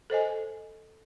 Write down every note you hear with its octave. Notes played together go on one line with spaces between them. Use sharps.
A4 C5 D#5 G#5